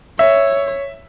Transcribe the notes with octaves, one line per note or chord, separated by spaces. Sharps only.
C#5 E5